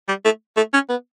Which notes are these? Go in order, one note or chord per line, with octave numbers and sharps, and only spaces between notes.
G3
A3
A3
C#4
B3